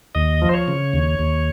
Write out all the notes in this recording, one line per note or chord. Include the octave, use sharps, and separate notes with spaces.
D#2 D#5
F3
C5
C#5
C#3
D#2
D#2